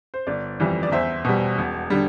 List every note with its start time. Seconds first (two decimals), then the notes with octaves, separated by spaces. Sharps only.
0.14 C5
0.27 G1 D5
0.60 F2 E3 G3
0.83 D5
0.92 E2 C5 E5
1.25 B2 G3
1.58 E1
1.90 D3 G3